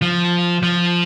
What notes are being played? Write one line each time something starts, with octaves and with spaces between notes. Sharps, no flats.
F3
F3